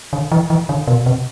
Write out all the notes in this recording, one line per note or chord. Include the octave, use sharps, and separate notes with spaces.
D3
E3
E3
D3
B2
C3